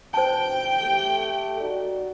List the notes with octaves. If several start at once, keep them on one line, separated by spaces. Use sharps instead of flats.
B2 D4 C5 G5 A5
A3 G4 A4
D#4 F#4 D5